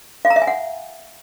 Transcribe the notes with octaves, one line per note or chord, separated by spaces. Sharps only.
F5
A#5
E5
G#5
F#5